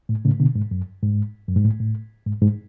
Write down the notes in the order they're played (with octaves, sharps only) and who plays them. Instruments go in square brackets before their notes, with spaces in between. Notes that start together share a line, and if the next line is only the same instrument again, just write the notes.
[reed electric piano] A2
A2 C#3
B2 D3
G#2
F#2
G#2
F#2
G#2
A2
A2
G#2
G#2